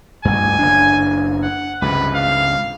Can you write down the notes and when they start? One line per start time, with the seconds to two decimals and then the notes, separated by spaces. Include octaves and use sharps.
0.25 A1 D2 G2 G#5
0.59 F#1 D4
1.43 F#5
1.82 C#2 G2 C3 B4
2.15 F5